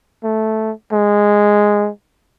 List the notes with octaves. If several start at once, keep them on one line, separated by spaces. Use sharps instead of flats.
A3
G#3